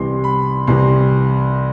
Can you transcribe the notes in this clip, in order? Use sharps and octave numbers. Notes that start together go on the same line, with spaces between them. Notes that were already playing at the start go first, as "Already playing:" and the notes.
Already playing: C2 C3 E3 C6
B5
C2 C3 E3 C6